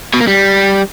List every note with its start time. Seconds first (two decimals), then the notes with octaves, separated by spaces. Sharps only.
0.14 B2
0.20 A#3
0.27 G3